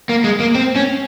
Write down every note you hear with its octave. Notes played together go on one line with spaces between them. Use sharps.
A#3
G#3
A#3
C4
C#4